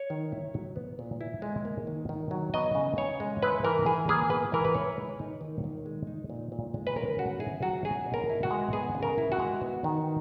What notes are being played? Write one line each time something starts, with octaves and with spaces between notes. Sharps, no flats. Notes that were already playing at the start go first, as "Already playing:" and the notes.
Already playing: C#5
D#3
E4
F#3
B3
A#2
E4
G#3
A#3
D#3
D#3
F#3
B3 D#5
C#3
C#3 C#5
G#3
E4 B4
E3 A#4
E3 G#4
A#3 G#4
B3 B4
E3 A#4
B4
E4 C#5
G#3
D#4
D#3
D#3
G#3
D#4
A#2
A#2
G#3
B4
C#4 A#4
C#3 F#4
E4 G#4
F#3 F#4
C#4 G#4
B2
A#4
E4
F#4
G#3
B3 G#4
C#3
A#4
E4
F#4
G#3
B3
D#3